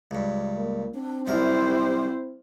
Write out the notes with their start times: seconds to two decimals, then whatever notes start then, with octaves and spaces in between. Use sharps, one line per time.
0.11 C#2 G2
0.57 A#3
0.94 C4 D4
1.28 C2 F#2 E4 G4 A#4 C5